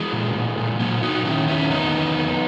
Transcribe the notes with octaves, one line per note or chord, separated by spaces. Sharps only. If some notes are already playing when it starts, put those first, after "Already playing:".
Already playing: E3 G#3
A#2
A#2
A#2
A#2 F#3 A#3
A#2 D#4 F#4
D#3 C#4 E4
E2 C#4 E4
D#3 B3 D#4
E2
E2